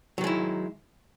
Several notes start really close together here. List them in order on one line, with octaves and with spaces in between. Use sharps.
F#3 D#3 G#3 E4